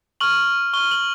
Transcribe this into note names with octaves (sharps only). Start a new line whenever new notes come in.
C#6 F6 F#7
C#6 F6 G7
F#7